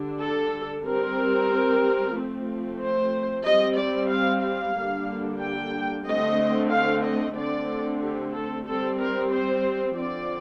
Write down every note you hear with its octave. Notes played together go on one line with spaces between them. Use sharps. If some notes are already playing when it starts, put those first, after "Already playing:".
Already playing: D3 G3 D4
A4
G3 C4 A#4
F3 A3 C4
C5
G3 C4 D#5
D5
F5
F5
D3 G3 A#3 D4
G5
D3 A3 C4 D#5
F5
D#5
D3 A3 C4 D5
G4
A4
G3 C4 A4
A#4
C5
D3 F3 C4 D5